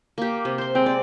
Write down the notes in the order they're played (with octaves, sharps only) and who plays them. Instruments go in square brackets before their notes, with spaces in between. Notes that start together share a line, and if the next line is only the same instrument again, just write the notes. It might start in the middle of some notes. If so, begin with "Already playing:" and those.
[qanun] A#3 G4
C3
C5 C6
[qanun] G#3 [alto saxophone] C4
[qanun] D5